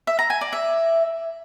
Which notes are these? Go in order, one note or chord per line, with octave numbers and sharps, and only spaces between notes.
E5
A#5
G#5
D5
E5